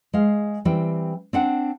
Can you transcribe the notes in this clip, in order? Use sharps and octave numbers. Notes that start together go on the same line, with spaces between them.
G#3 F5
E3 G3 C4 G5
C4 D4 F#5